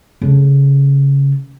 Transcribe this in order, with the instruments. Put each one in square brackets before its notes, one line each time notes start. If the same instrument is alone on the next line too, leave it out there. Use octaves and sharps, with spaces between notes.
[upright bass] C#3 A3